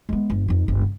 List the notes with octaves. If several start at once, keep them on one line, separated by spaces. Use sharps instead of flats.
G#3 B3
G1
F2 D#4
G1 C#2
C#3